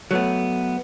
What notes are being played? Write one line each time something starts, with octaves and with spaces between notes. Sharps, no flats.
F#3 A3 B3